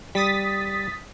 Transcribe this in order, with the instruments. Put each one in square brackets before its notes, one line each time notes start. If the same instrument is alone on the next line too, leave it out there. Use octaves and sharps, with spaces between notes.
[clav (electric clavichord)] G3 [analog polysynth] D#6 A6 B6